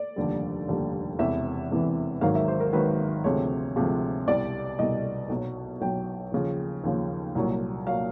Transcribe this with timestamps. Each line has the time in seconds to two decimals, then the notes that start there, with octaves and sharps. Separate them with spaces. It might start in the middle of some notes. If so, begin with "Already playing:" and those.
Already playing: D5
0.16 F1 D#2 D3 G3
0.68 F1 D#2 D3 G3
1.19 E1 E2 C3 E3 E5
1.71 E1 E2 C3 E3
2.21 G#1 G#2 D#3 F#3 F5
2.35 E5
2.48 C5
2.60 A#4
2.73 G#1 G#2 D#3 F#3 B4
3.24 D2 C3 F3 G#3 C#5
3.76 D2 C3 F3 G#3
4.27 C2 B2 G3 D5
4.79 C2 B2 G3 D#5
5.29 B1 B2 F#3
5.81 B1 B2 F#3 G5
6.32 D#2 C#3 F3
6.84 D#2 C#3 F3
7.35 C2 A#2 F#3
7.87 A#2 F#3 F5